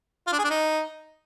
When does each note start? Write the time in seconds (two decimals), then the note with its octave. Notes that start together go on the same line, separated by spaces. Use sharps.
0.27 F4
0.33 D4
0.38 G#4
0.44 D4
0.50 D#4